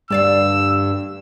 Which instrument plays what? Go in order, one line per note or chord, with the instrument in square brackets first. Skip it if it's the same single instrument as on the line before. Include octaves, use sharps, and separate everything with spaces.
[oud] D2 D5 F5 [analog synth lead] G2 [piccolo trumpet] E6